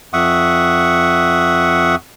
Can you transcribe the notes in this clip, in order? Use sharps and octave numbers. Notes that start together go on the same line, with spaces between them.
F2 E5 F#5 C#6 D#6